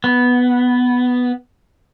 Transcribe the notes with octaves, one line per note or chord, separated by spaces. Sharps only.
B3